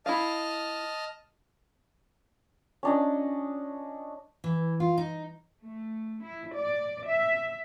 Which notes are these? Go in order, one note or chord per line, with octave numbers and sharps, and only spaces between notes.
E4 D#5 F5 A5 F6
C#4 D4 D#5
E3
F4
D#4
A3
E4
D5
E5